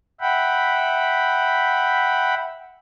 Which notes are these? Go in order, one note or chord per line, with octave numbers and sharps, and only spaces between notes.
E5 F#5 G5 B5